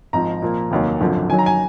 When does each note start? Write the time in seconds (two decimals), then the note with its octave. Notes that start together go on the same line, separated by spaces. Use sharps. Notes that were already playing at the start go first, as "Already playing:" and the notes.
0.13 G#1 G#2 F3 A#5
0.42 A#2 F3 A#3
0.71 F1 D#2 D#3 F#3
1.01 G#1 F#2 D3 F3
1.30 F#2 D#3 F#3 G#5
1.39 A#5
1.46 G#5